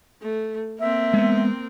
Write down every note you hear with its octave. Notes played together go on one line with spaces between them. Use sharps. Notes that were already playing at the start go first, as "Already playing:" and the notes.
A3
A#3 C4 E5
G#3 B3